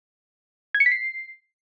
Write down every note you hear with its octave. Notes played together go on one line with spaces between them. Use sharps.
G#6
C#7
B6
C7